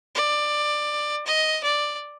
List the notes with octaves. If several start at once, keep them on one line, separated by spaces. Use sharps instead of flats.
D5
D#5
D5